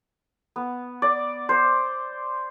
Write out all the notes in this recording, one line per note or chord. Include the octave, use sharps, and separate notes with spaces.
B3
D5
C5